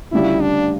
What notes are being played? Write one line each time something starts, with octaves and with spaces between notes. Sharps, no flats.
D2 C#3 G3 D4 E4 F4
D4